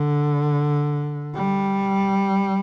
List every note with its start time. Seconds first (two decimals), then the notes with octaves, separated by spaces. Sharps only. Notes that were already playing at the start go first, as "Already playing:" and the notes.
Already playing: D3
1.36 G3